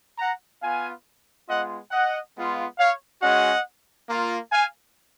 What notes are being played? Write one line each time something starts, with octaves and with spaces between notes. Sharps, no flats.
F#5 A#5
B3 F4 F5 G#5
G#3 B3 F4 D#5 F#5
D#5 F#5
G#3 B3 F4
C#5 F5
G#3 C#4 F#4 D#5 F#5
A#3 F4
F5 G#5